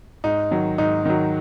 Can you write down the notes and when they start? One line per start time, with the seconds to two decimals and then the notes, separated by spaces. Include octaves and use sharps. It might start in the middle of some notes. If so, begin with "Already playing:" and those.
0.24 G#2 D#4
0.51 D#3 F#3
0.78 G#2 D#4
1.05 D#3 F#3